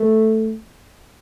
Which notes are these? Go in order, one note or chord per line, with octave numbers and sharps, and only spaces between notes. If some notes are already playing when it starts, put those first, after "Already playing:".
Already playing: A3